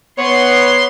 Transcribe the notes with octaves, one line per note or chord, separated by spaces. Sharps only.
B3 C#5 C6